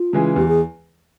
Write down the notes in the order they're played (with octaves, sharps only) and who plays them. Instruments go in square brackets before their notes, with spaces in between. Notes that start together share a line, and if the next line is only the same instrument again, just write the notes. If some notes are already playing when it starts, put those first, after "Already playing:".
Already playing: [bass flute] F4
[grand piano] C#3 E3 G#3
[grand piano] E2 [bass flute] G4
[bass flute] G#4